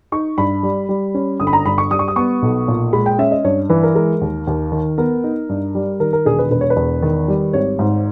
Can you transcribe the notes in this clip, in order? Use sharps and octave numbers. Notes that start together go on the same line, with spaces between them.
D#4 C#6
G2 B5
G3
G3
C#4
G1 D#6
B5
A#5
G2 B5
C#6
G3 D#6
C#6
D#6
B3 C#6
B1
A#2
G#3 B5
G5
C#4 E5
D#5
G2 C#5
E3 B4
A#4
G#3 A#4
D#2
D#2
D#3
B3 A#4
D#4
G2
G3
D#3 A#4
A#4
E1 G#4
B4
E1 B4
C#5
B4
E2
D#3
G3
G#1 C#5
G#2